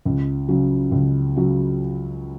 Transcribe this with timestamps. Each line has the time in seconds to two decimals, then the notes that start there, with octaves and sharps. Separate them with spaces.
0.05 C#2
0.48 C#3 F#3
0.92 C#2
1.36 C#3 F#3